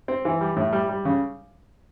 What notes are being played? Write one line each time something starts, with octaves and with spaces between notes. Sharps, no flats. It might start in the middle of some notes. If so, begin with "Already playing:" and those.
C4
E3
G3
A2
G3
G3
C#3